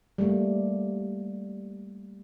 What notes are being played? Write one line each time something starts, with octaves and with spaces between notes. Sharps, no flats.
G3 A3 A#3